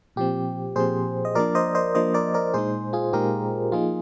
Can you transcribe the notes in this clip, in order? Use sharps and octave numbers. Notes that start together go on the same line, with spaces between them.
A#2 F3 C4 G4
A#2 F3 C4 G#4 C5
D#5
F3 A#3 D4 A#4 D5
C5 D#5
C5 D#5
F3 A#3 D4 C5 D#5
A#4 D5
A#4 D5
A#2 G#3 D#4 G#4 C5
F4 G#4
A#2 G#3 D#4 G4 A#4
F3 A#3 D#4 F4 G#4